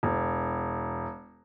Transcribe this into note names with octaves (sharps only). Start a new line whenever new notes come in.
E1